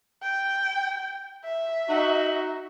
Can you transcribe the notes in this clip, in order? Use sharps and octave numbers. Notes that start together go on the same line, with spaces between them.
G5
E5
D#4 F#4